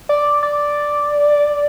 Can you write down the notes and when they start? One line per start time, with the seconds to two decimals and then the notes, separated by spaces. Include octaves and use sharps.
0.09 D5
0.43 D5